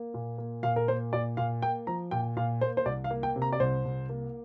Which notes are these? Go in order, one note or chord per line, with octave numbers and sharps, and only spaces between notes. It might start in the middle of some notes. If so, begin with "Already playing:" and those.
Already playing: A#3
A#2
A#3
A#2 F5
A#4
A#3 C5
A#2 D5
A#2 F5
A#3 G5
F3 A#5
A#2 G5
A#2 F5
A#3 C5
C5
C2 D5
F5
A#3
G5
C3
A#5
D5
C2 C5
C2
A#3